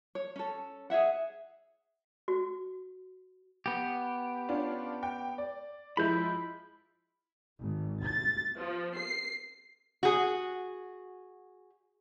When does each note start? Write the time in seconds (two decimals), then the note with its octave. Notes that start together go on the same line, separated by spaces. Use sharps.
0.15 C#5
0.36 C#4 A4
0.90 G#4 C#5 E5 F#5
2.28 F#4
3.66 B3 G4
4.48 C#4 D4 F4
5.03 G5
5.38 D5
5.97 F3 G#3 E4 B5 G6
7.60 G#1
8.03 A6
8.57 F3
8.96 C7
10.03 F#4 G#4